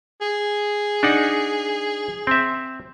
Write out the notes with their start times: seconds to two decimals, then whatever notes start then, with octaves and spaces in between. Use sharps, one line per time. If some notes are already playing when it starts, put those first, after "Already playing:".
0.21 G#4
1.03 D4 D#4 F#5
2.27 C4 E5